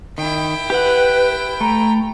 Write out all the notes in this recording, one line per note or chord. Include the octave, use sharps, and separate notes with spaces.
D#3 E4 G5
G4 B4 F#5
A3 A#5